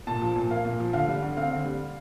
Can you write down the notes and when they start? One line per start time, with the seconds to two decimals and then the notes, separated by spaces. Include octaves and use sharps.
0.07 A#2 A5
0.22 F3
0.36 A#2
0.50 A#3 F5
0.65 A#2
0.80 F3
0.93 D3 F5
1.08 G3
1.22 D3
1.37 C4 F5
1.51 D3
1.65 G3